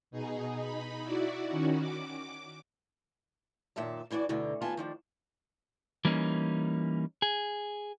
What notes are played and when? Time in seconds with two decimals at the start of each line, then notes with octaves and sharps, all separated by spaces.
0.11 B2 D#4 G#4
0.54 D#4 B5
1.02 E4 F#4 D5
1.49 D#3 C#4 F#4
1.81 D6
3.76 F#2 A#2 D#3 E5 A5
4.10 F#2 E3 D4 F#4 D5
4.29 D2 B2 D3 D#4
4.61 D#2 B3 F4 G#5 A5
4.77 D#3 F3 D4
6.05 E3 G3 A#3 C#4 D#4
7.22 G#4